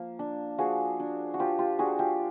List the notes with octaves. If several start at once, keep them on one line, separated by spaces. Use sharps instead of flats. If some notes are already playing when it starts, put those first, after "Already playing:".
Already playing: F3 A#3
D4
F3 F#4 G#4
D4
F#4
F3 F4 G4
F4 G4
D4 F#4 G#4
F4 G4